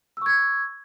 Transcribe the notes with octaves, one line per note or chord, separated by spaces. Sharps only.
C#6 E6 G#6